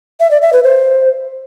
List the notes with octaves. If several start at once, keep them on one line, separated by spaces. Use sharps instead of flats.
E5
D5
E5
B4
C5